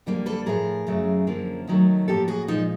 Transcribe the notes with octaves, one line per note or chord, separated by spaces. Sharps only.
F2 D3 G3 A#3
A4 B4
A2 F3 A3 G#4 A#4
F#2 C#3 F#3 A3
F#2 D3 F3 A#3
D#2 D#3 F#3 A3
A2 F3 A#3 G4 A4
F#4 G#4
A#2 F3 G#3 D#4 F4